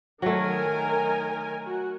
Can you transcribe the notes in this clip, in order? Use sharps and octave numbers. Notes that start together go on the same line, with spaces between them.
D#3 F#3 A3 A#4 G#5
F#4